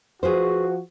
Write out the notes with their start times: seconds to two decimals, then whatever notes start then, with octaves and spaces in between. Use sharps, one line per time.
0.23 F3 F#4 G#4 B4 C5